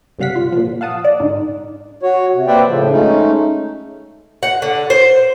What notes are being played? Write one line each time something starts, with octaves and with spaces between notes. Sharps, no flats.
G1 C3 G3 F5 F#5 B6
F4
A#2 F3
F5 F#5 A5 D#6
D5
G#2 D3 D#4
F#4 C#5
C3
A#3 B4 C5 D5 E5 G5
A2 C#3 F3
G#3 A3 C#4 D#4
F#5
D3
C5